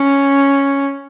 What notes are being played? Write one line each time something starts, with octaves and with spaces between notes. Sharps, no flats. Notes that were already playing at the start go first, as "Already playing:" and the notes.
Already playing: C#4